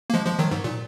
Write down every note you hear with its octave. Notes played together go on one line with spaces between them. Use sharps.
A#3
F3 G#3
F3 G#3
D#3 F#3
G#2
A#2